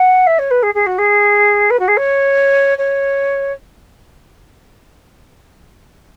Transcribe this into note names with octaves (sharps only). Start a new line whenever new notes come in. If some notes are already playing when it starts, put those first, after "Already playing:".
Already playing: F#5
E5
C#5
B4
G#4
G#4
F#4
G#4
B4
F#4
G#4
C#5
C#5